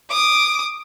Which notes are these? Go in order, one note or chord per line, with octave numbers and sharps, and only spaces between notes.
D6 D#6